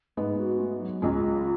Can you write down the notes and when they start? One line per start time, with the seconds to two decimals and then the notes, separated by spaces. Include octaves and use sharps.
0.17 G#2 G#3 A3 B3
0.39 F#4
0.60 A3
0.80 F#3
1.02 C#2 C#3 G#3 C#4 F4 G#4